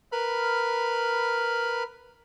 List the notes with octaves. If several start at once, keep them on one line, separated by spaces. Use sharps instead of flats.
A#4 B4 B5 F6